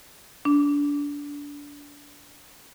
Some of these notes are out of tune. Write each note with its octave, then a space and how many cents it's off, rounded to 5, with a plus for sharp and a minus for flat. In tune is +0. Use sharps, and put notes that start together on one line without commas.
D4 -25